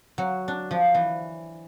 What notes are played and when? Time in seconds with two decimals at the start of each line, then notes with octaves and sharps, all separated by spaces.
0.18 F#3
0.48 D4
0.71 F3
0.94 E3